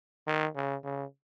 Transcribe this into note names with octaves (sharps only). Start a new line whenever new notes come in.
D#3
C#3
C#3